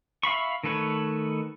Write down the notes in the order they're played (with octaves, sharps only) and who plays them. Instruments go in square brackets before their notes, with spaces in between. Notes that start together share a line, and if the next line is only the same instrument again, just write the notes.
[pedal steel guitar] E5 F5 B5 C#6
D#3 A3 A4 B4 C#5